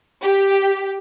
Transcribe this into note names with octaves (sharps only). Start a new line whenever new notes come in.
G4